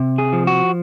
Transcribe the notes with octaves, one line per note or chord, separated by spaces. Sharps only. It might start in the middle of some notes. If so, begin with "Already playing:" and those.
Already playing: C3
G#4
F3
F#4